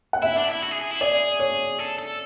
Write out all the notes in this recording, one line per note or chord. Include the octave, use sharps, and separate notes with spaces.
F#5
E4 E5
D4
E4
F#4
G#4
G#4
E4
G#4 D5
C#5
A4
A4